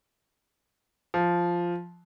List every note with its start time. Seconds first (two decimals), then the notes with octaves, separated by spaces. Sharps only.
1.14 F3